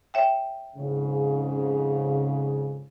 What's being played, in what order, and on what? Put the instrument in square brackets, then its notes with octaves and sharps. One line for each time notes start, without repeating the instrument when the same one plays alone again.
[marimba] C#5 E5 G5
[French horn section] F2 G#2 C#3